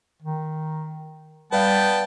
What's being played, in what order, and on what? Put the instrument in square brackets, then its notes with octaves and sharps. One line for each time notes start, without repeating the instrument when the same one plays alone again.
[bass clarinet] D#3
[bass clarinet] G3 [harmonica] B3 G5 A5 [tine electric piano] B4 D5 F5